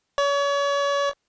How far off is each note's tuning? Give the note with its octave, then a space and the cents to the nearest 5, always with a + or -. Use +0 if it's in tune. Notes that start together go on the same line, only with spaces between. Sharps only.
C#5 +35